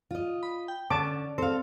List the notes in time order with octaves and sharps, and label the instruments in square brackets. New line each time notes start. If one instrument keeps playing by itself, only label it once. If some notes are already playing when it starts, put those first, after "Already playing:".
[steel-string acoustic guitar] F4 D#5
[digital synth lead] B5
G5
[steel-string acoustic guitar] D3 [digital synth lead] C#4 [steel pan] A5 D6
[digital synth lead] C4 [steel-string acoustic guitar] A4 F5